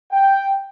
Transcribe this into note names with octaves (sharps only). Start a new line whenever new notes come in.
G5